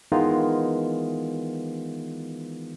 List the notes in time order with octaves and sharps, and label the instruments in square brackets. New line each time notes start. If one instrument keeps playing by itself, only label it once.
[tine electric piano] D#3 E3 G#3 B3 D#4 F4